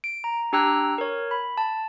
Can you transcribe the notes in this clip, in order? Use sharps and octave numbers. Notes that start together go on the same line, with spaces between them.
D7
A#5
D4 G4 G5 A#5 E6 F#6
A#4 C#5
B5
A5